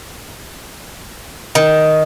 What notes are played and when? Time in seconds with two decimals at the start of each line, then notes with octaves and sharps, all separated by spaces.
1.55 D#3